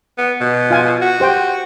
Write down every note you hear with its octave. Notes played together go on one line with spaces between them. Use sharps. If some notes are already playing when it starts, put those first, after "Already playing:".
B3
B2
F4 F5 G#5
F#4
G4 C5 G5